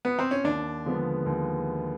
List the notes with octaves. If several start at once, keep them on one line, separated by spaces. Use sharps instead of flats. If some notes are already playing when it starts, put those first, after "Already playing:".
B3
C4
C#4
D#2 D4
D3 F3 G#3 B3
D#2